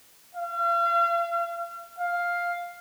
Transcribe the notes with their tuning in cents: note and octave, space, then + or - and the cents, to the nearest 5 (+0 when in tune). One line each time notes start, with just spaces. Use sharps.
F5 -40
F5 +5